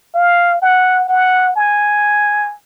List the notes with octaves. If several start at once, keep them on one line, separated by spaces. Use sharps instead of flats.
F5
F#5
F#5
G#5